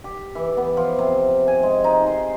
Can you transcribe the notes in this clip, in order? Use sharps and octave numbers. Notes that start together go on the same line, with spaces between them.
G4
E3
B3
F3
C3
G#5
G#3
D#4
C6